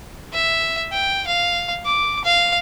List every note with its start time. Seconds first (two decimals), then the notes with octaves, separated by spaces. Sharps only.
0.33 E5
0.92 G5
1.27 F5
1.85 D6
2.24 F5